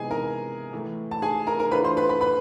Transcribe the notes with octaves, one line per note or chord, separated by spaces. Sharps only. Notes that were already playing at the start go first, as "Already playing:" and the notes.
Already playing: C3 E3 G#3 B3 D#4 G#4 G#5
A#4 A#5
A2 E3 A3
A5
G#4 G#5
A#4 A#5
A#4 A#5
E3 A3 D4 F4 B4 B5
C5 C6
B4 B5
B4 B5
B4 B5